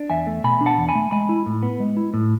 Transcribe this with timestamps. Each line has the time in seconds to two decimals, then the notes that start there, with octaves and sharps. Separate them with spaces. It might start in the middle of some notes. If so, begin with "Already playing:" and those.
Already playing: D4
0.10 E2 E5 G#5
0.27 A3
0.44 B2 G#5 B5
0.61 D4
0.66 F#5 A5
0.78 E2
0.89 G#5 B5
0.95 A3
1.11 G#3 G#5 B5
1.29 E4
1.46 A2
1.63 B3
1.80 G#3
1.97 E4
2.14 A2